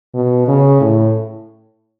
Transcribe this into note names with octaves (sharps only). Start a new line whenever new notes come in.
B2
C#3
A2